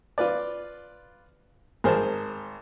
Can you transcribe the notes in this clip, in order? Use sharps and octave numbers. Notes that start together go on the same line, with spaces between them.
F4 B4 D5
G#1 G#4 A#4 C5 A5